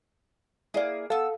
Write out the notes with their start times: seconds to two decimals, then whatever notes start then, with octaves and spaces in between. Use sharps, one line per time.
0.74 A#3 E4 G#4 D5
1.10 B3 A4 F5 E6